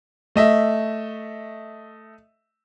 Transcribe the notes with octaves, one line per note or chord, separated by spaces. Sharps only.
A3 D#5 E5